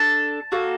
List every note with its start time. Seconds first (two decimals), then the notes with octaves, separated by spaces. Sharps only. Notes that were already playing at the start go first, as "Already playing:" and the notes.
Already playing: D4 A4 A5
0.52 A#3 F#4 A4